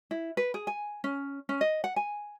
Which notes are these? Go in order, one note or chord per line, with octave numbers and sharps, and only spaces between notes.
E4
B4
G#4
G#5
C#4
C#4
D#5
F#5
G#5